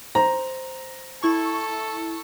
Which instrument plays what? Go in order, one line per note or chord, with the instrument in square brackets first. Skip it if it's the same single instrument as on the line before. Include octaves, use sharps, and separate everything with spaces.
[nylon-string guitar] C5 [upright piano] A#5
[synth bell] E4 C#6 [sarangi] A4